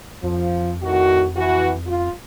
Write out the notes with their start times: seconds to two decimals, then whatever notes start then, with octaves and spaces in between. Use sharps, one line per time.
0.23 F2 F3
0.83 A2 D#3 F#4
1.36 E3 F#4
1.87 F4